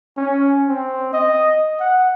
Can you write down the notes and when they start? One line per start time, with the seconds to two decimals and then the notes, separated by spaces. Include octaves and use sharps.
0.17 C#4
0.68 C4
1.13 D#5
1.80 F#5